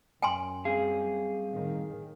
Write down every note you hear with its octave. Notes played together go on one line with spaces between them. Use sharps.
F#2 G5 G#5 C6
G3 C4 G#4 F5
A2 D#3